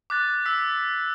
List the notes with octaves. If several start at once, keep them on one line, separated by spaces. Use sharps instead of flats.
D6 F#6 A6
E6 B6